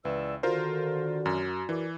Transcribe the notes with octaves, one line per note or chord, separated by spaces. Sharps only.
C#2 E3 D5 E6
D3 D#3 F4 F#4 A#4 C5
F#2
E3 A#4 D5